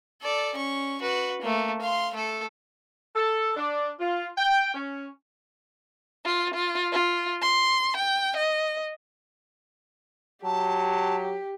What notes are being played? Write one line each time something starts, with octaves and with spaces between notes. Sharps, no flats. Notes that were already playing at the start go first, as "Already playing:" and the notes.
A4 D5
C#4 C#6
F#4 B4
A3 A#3
F5 C6
A3 A4
A4
D4
F4
G5
C#4
F4
F4
F4
C6
G5
D#5
F#3 G4 A5